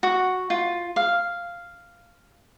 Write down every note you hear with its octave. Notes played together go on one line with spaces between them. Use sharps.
F#4
F4
F5